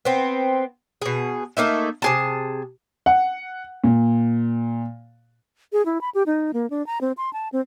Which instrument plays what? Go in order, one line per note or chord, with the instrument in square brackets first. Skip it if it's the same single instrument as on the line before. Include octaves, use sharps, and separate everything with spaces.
[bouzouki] B3 C4
B2 G#4
A3 A#3 D#4 E5
C3 G#4 A5
[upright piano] F#5
A#2
[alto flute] G#4
E4
B5
G4
D#4
A#3
D4
A#5
C4
C6
A5
C4